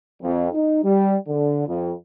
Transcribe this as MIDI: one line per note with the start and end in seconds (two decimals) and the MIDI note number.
0.22 0.48 41
0.53 0.80 63
0.84 1.16 55
1.27 1.64 50
1.68 1.92 41